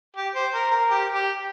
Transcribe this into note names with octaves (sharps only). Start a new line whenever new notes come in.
G4
C5
A#4
A#4
G4
G4